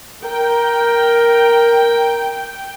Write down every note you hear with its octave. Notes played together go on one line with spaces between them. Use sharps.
A#4 G5